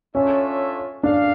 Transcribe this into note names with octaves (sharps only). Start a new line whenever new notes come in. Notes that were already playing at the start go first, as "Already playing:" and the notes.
C#4 D4 F4 A4 C#5 E5
D4 F5